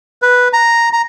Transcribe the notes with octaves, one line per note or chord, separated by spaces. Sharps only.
B4
A#5
A#5